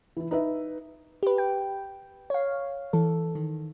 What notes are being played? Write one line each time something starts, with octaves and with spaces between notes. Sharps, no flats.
E3 E4
D#4 B4 E5
G4 B4
G5
C#5 F5
E3 A4
D#3